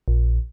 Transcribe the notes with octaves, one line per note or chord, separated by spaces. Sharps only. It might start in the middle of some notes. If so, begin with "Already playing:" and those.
A#1